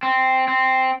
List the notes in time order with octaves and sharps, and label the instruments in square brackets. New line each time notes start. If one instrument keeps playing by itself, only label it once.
[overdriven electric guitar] C4
C4